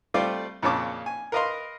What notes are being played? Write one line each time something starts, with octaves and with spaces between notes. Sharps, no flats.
G3 A3 C4 F4 D5
F2 A#2 C#3 C#5 A5 D6
G#5
A#4 B4 D#5 F5 A#5 C6